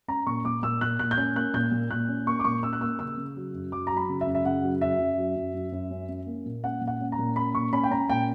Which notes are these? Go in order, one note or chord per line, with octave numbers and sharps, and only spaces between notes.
C#4 A#5
A#2 C#6
A#2 D6
A#2 E6
A#2 F#6
A#2 F#6
G6
C#4 F#6
A#3 F#6
A#2 G6
A#2
A#2 F#6
C#4
A#3 C#6
D6
A#2 C#6
C#4 E6
F#6
A#3 E6
C#3 E6
C#3
F#3
F#2
F#3 D6
F#3 A#5
B5
C#3
E5
F#2
E5
C#3 F#5
F#3
F#2 E5
F#2
F#3
F#2
F#2
F#2
C#4
C#4
A#3
A#2
C#4 F#5
A#2
F#5
C#4
A#5
A#2
C#4 B5
A#2 C#6
C#4 B5
G5
C#4 A#5
A#2 G5